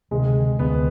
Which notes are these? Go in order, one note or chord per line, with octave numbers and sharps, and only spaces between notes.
D2 C3 D#3 G#3
D2 C3 D#3 B3